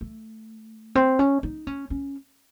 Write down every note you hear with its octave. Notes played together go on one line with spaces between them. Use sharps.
A3
C4
C#4
D#4
C#4
C#4